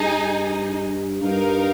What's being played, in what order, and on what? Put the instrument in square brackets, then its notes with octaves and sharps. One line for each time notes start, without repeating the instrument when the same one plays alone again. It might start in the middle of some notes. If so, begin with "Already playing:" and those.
Already playing: [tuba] G2 [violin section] D#4 G#4 D#5 G#5
[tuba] G2 [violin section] D#4 A#4 F5